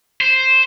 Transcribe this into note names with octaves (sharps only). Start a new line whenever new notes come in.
C5